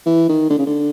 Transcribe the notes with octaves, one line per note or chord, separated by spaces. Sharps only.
E3
D#3
D3
C#3
D3